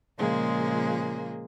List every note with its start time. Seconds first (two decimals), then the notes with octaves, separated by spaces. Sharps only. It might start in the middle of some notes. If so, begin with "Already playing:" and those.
0.18 A#2 C#3 F3 G#3 A#3 G#4